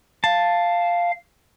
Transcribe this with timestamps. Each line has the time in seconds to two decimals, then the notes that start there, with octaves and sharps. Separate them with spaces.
0.24 F5 A5